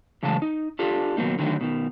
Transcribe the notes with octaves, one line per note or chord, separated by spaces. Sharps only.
A2 C#3 E3 F#3 G#3 A5
D#4
D4 F4 G4 A4
B2 D#3 F#3 G3 A#3 D#4
D3 D#3 F#3 A3
B2 D#3